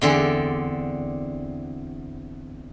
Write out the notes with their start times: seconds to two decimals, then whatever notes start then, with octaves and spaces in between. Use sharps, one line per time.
0.01 E2 D3 C4 D5